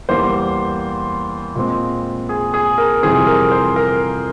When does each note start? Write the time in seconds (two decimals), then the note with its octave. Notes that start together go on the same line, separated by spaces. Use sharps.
0.09 E2 E3 G3 A#3 C5
1.56 A#2 G#3 C4
2.29 G#4
2.54 G#4
2.78 A#4
3.03 F2 C3 E3 G3 C4 G#4
3.27 A#4
3.51 C5
3.76 A#4